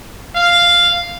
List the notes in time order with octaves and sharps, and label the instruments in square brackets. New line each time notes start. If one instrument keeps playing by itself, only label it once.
[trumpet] F5